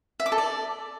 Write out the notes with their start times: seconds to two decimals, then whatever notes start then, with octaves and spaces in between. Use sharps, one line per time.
0.20 E5
0.26 D6
0.32 A4
0.38 D5